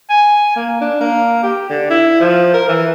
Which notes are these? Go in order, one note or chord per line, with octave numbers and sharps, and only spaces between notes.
G#5
A#3
D4
A#3
G4
D3
E4
F3
A#4
E3